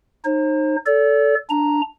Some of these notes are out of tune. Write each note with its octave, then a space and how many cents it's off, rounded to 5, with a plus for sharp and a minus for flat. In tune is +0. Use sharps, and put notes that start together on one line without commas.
D#4 -20 C5 +40
A4 +0 D5 -40
D4 +0 A#5 +0